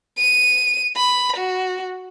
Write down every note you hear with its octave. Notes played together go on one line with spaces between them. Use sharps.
D#7
B5
F#4